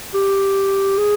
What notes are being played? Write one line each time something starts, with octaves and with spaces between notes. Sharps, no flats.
G4
G#4